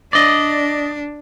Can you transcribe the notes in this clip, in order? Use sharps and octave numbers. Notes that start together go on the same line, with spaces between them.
D4 D5 D#5